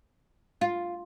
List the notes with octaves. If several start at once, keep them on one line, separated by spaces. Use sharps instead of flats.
F4